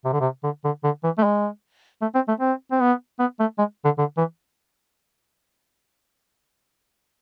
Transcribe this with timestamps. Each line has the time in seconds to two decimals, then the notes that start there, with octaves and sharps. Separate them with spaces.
0.04 C3
0.13 D3
0.21 C3
0.43 D3
0.64 D3
0.84 D3
1.04 E3
1.18 A3
1.23 G#3
2.02 A3
2.15 C4
2.28 A3
2.40 C4
2.71 C4
2.81 B3
3.19 B3
3.39 A3
3.58 G#3
3.85 D3
3.98 D3
4.17 E3